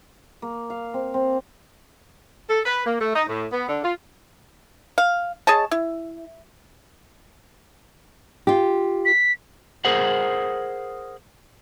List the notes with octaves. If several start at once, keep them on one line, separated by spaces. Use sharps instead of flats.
A#3
F5
C4
C4
A4
B4
A#3
A3
D#4
A2
B3
D3
F4
F5
G#4 C#5 D#5 A5
E4
F4 G4
B6
G#4 A#4 C5 F#5